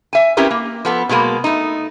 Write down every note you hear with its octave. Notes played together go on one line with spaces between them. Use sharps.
E5 G#5
C4 C#4 E4 G4 A#4 B4
A#3
F3 B3 A4
B2 F#3 G#3 A#3
A3 D#4